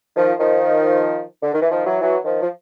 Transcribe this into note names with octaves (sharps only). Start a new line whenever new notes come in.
D#3 F3
D#3 F3
D3
D#3
E3
D#3 F3
E3 F#3
E3 F#3
D#3 F3
F3